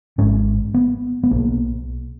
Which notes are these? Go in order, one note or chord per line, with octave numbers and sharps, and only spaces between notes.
G#1 G#2 C#4
B3
B3
B1 B2 A#3